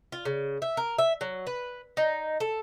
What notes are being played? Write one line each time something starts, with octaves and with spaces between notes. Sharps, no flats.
F4
C#3
E5
A#4
E5
F#3
B4
D#4
A4